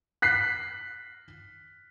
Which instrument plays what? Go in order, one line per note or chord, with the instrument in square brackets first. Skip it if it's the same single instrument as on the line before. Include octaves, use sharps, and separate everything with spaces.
[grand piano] F#6 B6 C7